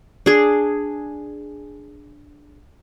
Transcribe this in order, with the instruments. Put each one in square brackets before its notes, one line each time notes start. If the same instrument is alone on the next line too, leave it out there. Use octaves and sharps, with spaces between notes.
[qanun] D4 G#4